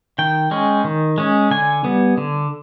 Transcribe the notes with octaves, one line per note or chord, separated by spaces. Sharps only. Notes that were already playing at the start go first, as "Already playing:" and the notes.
D#3 G5
G#3 C#4
D#3
G#3 C#4
D3 G#5
G3 B3
D3